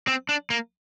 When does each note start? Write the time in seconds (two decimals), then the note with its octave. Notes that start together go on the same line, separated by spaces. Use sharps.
0.07 C4
0.29 D4
0.50 A#3